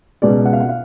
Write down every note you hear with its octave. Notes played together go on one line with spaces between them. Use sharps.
C#2 B2 G#3 D5
F#5
F5
F#5
F5